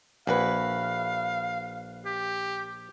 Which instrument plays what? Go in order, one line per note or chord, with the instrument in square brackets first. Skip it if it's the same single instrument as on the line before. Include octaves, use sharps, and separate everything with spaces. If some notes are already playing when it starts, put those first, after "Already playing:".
[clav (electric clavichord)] A#1 [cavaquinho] E4 F#4 B4 [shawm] F5
[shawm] G4